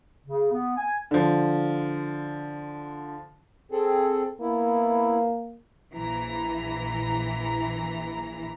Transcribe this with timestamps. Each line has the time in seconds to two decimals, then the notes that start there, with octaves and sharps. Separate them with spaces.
0.25 C#3
0.51 B3
0.76 G#5
1.11 D3 F3
3.71 C4 G#4 A4
4.41 A#3 B3 E4
5.93 A#1 E3 A#5